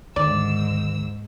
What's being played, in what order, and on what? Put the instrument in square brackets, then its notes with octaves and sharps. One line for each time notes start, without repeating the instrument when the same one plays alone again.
[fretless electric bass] D2 [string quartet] G#2 E6 [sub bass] D#3 [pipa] D5